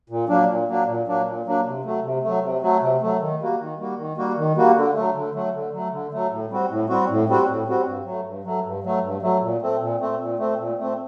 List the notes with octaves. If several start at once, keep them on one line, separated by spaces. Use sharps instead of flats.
A#2
F#3 A#3 D4
A#2
F#3 A#3 D4
A#2
F#3 A#3 D4
A#2
F#3 A#3 D4
C3
F#3 A3
C3
F#3 A3
C3
F#3 A3
C3
F#3 A3
D#3
G3 A#3 F#4
D#3
G3 A#3 F#4
D#3
G3 A#3 F#4
D#3
G3 A#3 F#4
D3
F#3 A3
D3
F#3 A3
D3
F#3 A3
D3
F#3 A3
A2
G3 C4 F#4
A2
G3 C4 F#4
A2
G3 C4 F#4
A2
G3 C4 F#4
G2
F#3 A3
G2
F#3 A3
G2
F#3 A3
G2
F#3 A3
A#2
A3 C4
A#2
A3 C4
A#2
A3 C4
A#2
A3 C4